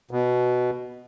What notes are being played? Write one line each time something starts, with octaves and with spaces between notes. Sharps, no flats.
B2